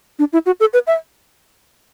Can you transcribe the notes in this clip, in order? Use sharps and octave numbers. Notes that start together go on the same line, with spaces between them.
D4
E4
F#4
A4
B4
E5